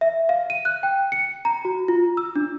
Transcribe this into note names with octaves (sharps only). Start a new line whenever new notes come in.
E5
F5
D#7
F#6
G5
C#7
A#5
F#4
F4
E6
D4